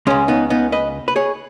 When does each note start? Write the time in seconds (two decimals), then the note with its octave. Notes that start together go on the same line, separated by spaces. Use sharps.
0.07 C#2 C#3 G#3 C#4
0.28 B3 D#4
0.50 B3 D#4
0.72 B4 D#5
1.08 B4
1.16 G#4 C#5